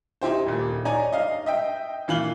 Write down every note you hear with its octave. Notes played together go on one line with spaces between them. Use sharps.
D#4 E4 G4 C5
D#1 A#2
D#4 C#5 D5 G#5 A#5
D#5 F5
D#5 E5 G5
A#2 E3 F5 F#7 G7